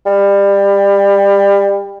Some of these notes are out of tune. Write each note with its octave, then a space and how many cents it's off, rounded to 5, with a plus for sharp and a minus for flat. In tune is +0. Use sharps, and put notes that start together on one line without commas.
G3 +25